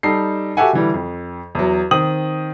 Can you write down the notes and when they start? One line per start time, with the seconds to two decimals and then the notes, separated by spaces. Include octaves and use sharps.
0.03 G3 D#4 A4 C7
0.57 F#4 G4 A4 E5 F#5 G#5
0.73 D3 E3 G3
0.94 F2
1.55 E2 F#3
1.91 D#3 C4 D#6 F#7